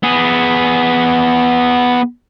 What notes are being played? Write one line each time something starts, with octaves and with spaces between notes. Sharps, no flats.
B3 G#4